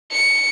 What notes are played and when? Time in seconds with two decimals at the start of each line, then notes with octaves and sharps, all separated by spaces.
0.12 C#7